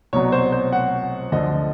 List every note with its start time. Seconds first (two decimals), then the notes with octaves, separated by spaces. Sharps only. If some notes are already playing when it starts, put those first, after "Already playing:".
0.13 C2 B2 F#3 C#5
0.32 C5
0.52 C5
0.72 F#5
1.32 D2 D3 F3 D#5